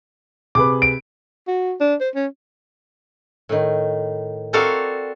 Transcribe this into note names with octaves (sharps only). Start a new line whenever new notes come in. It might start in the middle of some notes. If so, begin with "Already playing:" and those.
C3 G#4 B4 D6
D7
F#4
D4
C5
C#4
A2 D#3
C4 F#4 A4 A#4 D5 F5